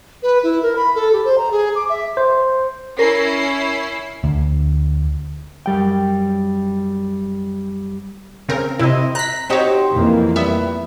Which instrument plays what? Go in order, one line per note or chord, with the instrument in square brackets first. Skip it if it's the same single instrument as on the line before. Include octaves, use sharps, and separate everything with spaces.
[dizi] B4
E4
A#4
B5
A4
G4
C5
A#5
G#4
D6
E5
[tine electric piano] C5
[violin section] C#4 E4 C7 [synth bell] A#4
[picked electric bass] D2
[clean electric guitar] F#2 G3 G5
[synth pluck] C#3 C4 A#4
[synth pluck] C3 E4 [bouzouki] C4 D#5
[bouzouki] A#5 [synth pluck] F#6 B6
[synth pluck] C4 F#4 C#5 [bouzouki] D#4 G4 C5
[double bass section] F2 E3 A#3
[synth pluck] G3 E5 [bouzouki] B3